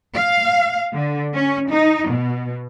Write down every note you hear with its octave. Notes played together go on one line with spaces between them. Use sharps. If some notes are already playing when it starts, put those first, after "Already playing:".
F5
D3
C#4
D#4
B2